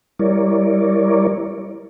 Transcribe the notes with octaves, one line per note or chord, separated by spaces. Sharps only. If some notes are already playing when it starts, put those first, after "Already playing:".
G3 E4 A#4 C#5 D5